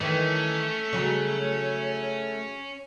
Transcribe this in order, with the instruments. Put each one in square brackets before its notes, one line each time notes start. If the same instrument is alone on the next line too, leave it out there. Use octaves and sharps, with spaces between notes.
[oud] D#3 E3 [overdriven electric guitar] A3 [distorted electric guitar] C#4
[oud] C#3 F#3 [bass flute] C#5